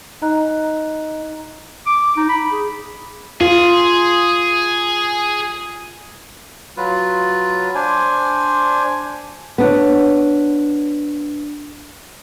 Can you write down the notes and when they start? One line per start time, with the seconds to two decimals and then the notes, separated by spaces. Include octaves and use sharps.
0.22 D#4 D#5 A#5 F#6
1.86 D6
2.17 D#4
2.29 B5
2.52 G#4
3.41 F4 G#4
6.77 F#3 F4 B4
7.75 D4 C5 G#5
9.58 B3 D4 C#5